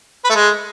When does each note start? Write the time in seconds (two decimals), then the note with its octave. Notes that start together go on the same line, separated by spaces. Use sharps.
0.24 B4
0.30 A3
0.35 G#3